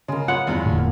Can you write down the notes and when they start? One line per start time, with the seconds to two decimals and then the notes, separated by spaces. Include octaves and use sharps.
0.08 C#3 G#3 A#4
0.28 B3 F4 C#5 F#5
0.47 E2 G2
0.65 E1 A2 D3
0.78 A#3